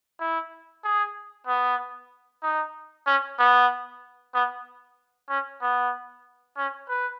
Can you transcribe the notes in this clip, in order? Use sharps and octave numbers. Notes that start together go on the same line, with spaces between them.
E4
G#4
B3
D#4
C#4
B3
B3
C#4
B3
C#4
B4